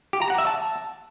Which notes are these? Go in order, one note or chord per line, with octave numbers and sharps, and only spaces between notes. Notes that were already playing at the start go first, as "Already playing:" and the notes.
G4
A#5
F#5
E5
A5